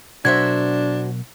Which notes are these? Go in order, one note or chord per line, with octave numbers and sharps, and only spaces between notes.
B2 F#3 D4 F#4 A#4 C5 E5 G#6